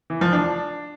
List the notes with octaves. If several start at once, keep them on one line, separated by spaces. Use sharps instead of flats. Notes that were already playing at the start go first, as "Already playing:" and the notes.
E3
F3
D4